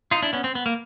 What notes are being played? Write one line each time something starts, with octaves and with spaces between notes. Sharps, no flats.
D#4 F4
D4 E4
B3 C#4
C4
B3
A#3